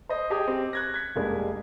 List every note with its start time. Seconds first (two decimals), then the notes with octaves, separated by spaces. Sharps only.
0.09 C5 D#5
0.30 G4 G#4 D#5 G#5 D#6
0.48 C4 G4
0.73 F#6 G#6 A#6
0.94 G#6 B6
1.16 F1 G3 G#3 A#3 D4 G#6